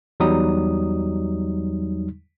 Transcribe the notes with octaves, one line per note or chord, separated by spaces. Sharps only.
E2 F#3 G3 D#4 D#6